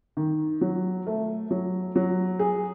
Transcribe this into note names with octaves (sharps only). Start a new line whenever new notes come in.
D#3
F#3
A3
F#3
F#3
G#4